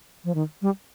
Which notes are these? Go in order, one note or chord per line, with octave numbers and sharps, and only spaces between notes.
F3
D#3
G3